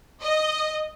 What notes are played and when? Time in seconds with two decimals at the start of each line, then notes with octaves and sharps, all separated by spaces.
0.22 D#5